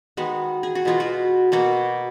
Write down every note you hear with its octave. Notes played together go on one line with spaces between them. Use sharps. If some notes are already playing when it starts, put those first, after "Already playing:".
D#3 G#3 B3 F#4
G#4
F#4
B2 G#3 B3 F4
F#4
B2 A#3 F#4